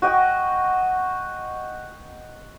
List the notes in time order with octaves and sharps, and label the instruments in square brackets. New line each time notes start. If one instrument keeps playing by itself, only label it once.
[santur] F#4 D#5 G5